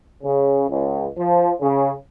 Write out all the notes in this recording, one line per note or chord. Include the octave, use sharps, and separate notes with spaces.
C#3
C#2
F3
C#3